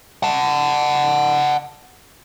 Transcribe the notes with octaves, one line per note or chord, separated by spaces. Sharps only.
F#5 A5